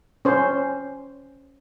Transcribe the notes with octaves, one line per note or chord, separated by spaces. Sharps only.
C#4 C5